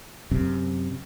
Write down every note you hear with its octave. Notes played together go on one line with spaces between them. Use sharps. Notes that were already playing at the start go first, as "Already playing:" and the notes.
F#2 C3